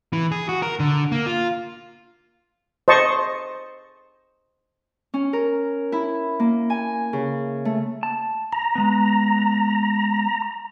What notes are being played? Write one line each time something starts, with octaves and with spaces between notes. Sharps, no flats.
E3
G#4
F#4
A#4
D3
A#3
F4
C5 D#5 A5 C#6
C#4
A#4
E4
A#3
G#5
C#3
A3
A5
A#5
G#3 B3